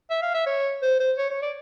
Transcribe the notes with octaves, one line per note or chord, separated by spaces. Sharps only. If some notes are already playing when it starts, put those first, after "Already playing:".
E5
F5
E5
C#5
C5
C5
C#5
C#5
D5